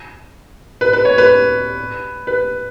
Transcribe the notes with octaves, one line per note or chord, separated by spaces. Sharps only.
B4
B4
C#5
B4
B4